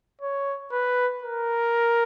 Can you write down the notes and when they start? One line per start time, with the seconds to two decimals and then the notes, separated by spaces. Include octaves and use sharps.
0.21 C#5
0.72 B4
1.24 A#4